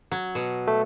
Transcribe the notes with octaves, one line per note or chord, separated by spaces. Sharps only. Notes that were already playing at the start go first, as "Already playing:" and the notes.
F#3
B2
A3